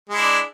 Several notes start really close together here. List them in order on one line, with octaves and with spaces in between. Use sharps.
G#3 E4 D4